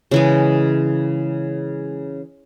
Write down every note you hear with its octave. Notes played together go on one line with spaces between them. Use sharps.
C#3 E3 G#3